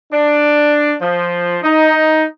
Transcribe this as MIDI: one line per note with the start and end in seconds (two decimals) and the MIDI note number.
0.13 0.94 62
1.01 1.59 53
1.63 2.24 63